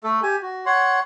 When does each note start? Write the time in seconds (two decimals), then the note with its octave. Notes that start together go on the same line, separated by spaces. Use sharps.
0.04 A3 A4
0.23 G4 G#5
0.42 F#4
0.66 C#5 F#5 C6